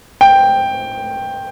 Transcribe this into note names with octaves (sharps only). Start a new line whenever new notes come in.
G5